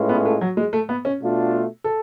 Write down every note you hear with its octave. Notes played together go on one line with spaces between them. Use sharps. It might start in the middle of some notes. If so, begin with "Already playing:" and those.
Already playing: A2 G#3 C#4 F4 B4
B3
A3
F#3
G#3
A3
B3
C#4
B2 A3 D4 F4
A4